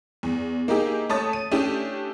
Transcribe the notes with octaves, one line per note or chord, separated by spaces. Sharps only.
E2
A#3 D#4 E4 G4 G#4
A3 C#5 A5 D#6 A6
D#7
A3 C#4 D4 E4 G4